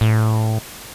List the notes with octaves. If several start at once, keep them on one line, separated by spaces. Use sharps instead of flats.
A2